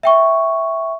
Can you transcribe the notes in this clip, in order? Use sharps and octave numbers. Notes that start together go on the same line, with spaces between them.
E5 G5 C#6